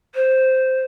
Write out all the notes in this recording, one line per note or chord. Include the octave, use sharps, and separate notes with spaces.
C5